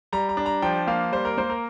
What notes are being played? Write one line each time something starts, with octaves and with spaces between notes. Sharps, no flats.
G3 A#5
A#5
D4
A#5
F3 G5
A#3 F5
G3 C5
A#4
A#3 C5
A#4